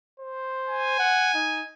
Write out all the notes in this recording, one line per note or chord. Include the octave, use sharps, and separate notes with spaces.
C5
G#5
F#5
D#4